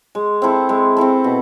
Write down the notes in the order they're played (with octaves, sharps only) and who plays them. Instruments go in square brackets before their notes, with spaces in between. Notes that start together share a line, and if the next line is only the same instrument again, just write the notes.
[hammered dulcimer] G#3
C4 E4 A4
G#3
C4 E4 A4
B2